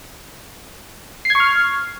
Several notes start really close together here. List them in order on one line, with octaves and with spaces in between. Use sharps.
C7 G#6 C#6 F6